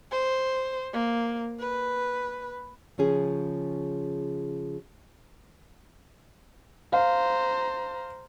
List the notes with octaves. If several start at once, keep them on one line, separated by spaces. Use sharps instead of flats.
C5
A#3
B4
C#3 F3 C#4 G#4
C5 F5 A#5